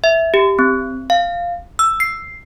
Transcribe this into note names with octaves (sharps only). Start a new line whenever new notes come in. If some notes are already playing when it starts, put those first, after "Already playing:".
E5
G4
C4
F5
E6
C7